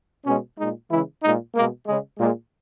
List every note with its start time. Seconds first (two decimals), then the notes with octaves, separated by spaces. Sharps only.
0.26 B2 G#3 C#4
0.57 A#2 G#3 D#4
0.89 C#3 E3 G#3 E4
1.22 A#2 G#3 D#4
1.54 B2 G#3 A#3
1.86 C#3 G#3
2.19 A#2 G#3